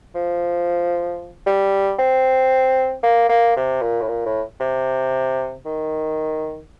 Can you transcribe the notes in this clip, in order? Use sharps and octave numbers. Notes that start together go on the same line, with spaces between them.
F3
G3
C4
A#3
A#3
C3
A#2
A2
A#2
A2
C3
D#3